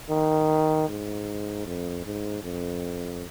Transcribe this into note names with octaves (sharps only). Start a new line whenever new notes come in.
D#3
G#2
F2
G#2
F2